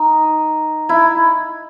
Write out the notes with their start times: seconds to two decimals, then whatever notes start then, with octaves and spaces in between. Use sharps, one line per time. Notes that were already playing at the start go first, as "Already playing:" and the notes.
Already playing: D#4
0.89 E4